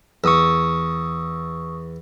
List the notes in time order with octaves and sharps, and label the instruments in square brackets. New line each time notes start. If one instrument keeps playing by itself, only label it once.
[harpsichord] E2 [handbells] C#6 D#6 E6